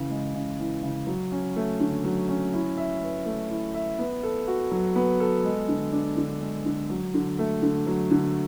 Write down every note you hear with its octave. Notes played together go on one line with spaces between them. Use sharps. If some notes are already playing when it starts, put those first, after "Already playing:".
Already playing: C#3 E3
G#3
C#3
E3
C#3
F#3
C#4
A3
D3
F#3
C#4
E4
E5
B4
A3
E4
E5
B3
A4
F#4
F#3
B3
A4
G#3
D3
D4
D3
G#3
D3
F#3
D3
A3
D3
F#3
D3